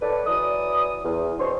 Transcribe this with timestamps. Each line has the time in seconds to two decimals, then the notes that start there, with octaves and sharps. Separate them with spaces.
0.02 A2 A4 B4 D5
0.26 E3 F#3 D5 D#6
1.04 E2
1.39 B2 C4 D4 C5 C#5 C6